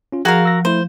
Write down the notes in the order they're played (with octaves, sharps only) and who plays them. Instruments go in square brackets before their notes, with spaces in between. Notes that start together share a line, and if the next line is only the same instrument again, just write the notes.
[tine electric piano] C#4 F4
[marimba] F3 [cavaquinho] F#4 A#4 F5 [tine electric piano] G#4
[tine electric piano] E6 A#6
[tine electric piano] A3 E4 [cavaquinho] C5